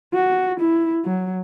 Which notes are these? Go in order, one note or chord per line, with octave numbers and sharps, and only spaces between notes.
F#4
E4
F#3